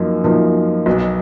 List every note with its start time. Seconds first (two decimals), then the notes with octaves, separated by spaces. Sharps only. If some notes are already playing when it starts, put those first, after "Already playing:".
Already playing: F#2 F3 A#3 D#4
0.24 F#2 F3 A#3 D#4
0.86 B1 B2 F#3